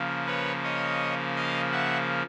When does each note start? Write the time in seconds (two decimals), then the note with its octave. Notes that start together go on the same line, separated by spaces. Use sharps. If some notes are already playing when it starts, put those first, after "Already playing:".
Already playing: C#3 F3 A#3
0.26 B4 C#5
0.63 C#5 D#5
1.36 D#5 F5
1.72 E5 F#5